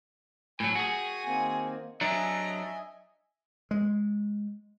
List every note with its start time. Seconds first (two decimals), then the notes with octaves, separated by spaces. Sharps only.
0.60 A2 F#3 G#5
0.75 F#4 G#4
1.26 D#3 A#3 C4
2.01 F#3 D4 D#5 E5 G#5 A#5
3.71 G#3